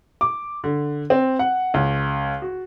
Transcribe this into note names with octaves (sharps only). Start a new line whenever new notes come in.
D6
D3
C4
F#5
C#2
F#4